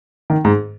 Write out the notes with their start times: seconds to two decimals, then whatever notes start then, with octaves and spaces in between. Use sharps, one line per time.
0.30 D#3
0.45 G#2